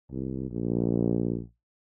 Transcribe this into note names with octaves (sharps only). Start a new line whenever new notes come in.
C2
A#1